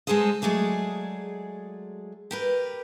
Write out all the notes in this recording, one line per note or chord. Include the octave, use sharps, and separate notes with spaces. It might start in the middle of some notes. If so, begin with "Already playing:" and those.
G#3 C4 G#4 A4 C5 D#5
F#3 G#3 A3 G#4 D5
G4 A#4 B4